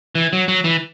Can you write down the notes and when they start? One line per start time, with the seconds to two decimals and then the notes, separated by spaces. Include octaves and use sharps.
0.15 E3
0.33 F#3
0.48 F#3
0.64 E3